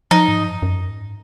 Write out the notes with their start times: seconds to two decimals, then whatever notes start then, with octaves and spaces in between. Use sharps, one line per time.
0.11 F3 D#4
0.28 G#2
0.45 F#2
0.62 F#2
0.88 G#2